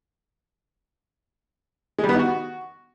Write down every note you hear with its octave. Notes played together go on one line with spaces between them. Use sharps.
G#3
G3
B3
D#4
F#4